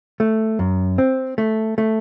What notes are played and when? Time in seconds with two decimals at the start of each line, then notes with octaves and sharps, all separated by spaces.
0.20 A3
0.59 F#2
0.98 C4
1.38 A3
1.78 A3